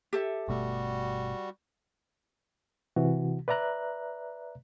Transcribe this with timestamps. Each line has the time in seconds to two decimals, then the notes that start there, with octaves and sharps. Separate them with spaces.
0.13 G4 A4 E5
0.48 G1 B2 G3 A3 F#4
2.96 C3 E3 F#4
3.48 B4 D5 E5 A#5 F#6